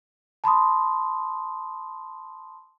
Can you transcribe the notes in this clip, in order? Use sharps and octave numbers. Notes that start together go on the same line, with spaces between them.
A5 B5 C6 D#6